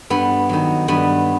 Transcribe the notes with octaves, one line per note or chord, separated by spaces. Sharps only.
G2 B3
D#3 F#3
G2 B3